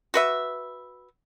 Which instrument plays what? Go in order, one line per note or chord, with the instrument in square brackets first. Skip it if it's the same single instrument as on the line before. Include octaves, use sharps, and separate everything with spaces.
[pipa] F#4 B4 E5